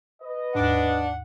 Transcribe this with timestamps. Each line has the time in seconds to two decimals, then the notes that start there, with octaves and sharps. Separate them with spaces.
0.23 B4 D#5
0.55 D#2 G#2 D4 F#5